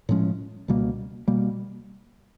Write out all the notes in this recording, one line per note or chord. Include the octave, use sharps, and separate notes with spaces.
A2 F3 G#3 C#4
C#2 B2 G3 A#3
B2 G3 A#3